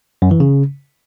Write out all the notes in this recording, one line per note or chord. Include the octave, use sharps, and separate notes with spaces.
F#2
E3
C#3